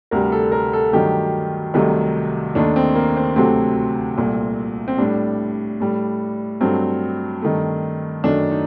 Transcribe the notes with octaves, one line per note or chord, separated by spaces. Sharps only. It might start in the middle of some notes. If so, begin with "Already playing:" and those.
D2 C3 G3 A#4
A4
A#4
A4
G2 D#3 F#3 A3 G4
C2 C3 D#3 F#3 A3
D#2 D#3 A3 D4
C4
A#3
C4
D2 C3 F#3 A3 C4
C2 A#2 A3
C4
A2 G3 D4
A2 G3
G2 F#3 A3 C4
G2 D#3 A3
F#2 D#3 A3 D4
D#4